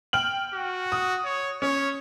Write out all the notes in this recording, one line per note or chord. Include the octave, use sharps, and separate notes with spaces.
G5 F6 F#7
F#4
D#6
C#5
C#4 C#5